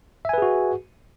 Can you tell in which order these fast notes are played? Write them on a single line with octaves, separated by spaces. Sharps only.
E5 G#5 B4 G#4 F#4